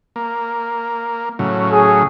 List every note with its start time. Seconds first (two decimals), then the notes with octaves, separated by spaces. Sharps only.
0.16 A#3
1.39 A2 C#3 F#3
1.72 G#4